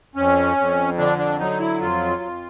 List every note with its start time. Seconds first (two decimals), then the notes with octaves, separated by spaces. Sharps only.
0.16 F2 C#4
0.57 F2
0.98 D3 D4
1.19 D4
1.40 F#3 D#4
1.60 E4
1.81 F2 F4
2.22 F2